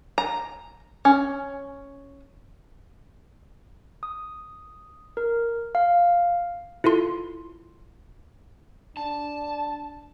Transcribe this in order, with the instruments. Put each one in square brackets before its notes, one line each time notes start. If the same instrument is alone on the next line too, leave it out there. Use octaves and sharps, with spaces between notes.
[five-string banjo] A#5
C#4
[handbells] D#6
A#4
F5
E4 F4 A4 C6
[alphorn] D4 [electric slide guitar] A5